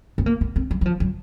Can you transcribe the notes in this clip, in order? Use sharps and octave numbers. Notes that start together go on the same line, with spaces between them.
B3
A#3
B3
C4
F#3
F#3
F3
F#3